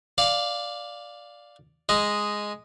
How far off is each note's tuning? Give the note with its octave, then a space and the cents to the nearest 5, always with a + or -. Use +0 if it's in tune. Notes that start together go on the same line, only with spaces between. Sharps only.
D5 +0 F5 +5
G#3 +0 D#5 +0